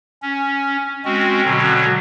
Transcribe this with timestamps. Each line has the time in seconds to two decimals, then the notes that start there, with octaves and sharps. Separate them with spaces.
0.22 C#4
1.05 G#3 C4 C#4 F#4
1.44 B2 D3 F#3